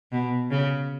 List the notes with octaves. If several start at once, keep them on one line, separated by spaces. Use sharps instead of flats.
B2
C#3